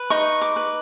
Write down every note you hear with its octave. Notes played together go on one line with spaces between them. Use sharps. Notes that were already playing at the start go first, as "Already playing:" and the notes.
Already playing: B4
D#4 C#6
D6
B4